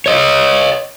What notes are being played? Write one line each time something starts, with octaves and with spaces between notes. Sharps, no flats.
C#5 D#5